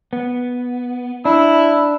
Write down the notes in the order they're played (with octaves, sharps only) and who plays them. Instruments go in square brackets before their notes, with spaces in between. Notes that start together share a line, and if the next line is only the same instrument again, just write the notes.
[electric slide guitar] B3
[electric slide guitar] D4 [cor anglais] E4